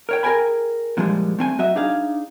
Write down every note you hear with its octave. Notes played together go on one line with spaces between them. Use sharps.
A#4 C#5 G5
G#4 A#4 D#5 G5 G#5 B5
A#2 D3 E3 F3 G3 G#3
A3 C4 G#5
F#3 F#4 D#5 E5
D4 D#4 G#4 F5